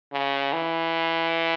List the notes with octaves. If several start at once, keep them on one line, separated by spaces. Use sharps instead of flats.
C#3
E3